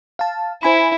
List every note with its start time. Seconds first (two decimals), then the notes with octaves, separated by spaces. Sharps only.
0.19 F5 A5
0.63 E4 C5 G#5 B5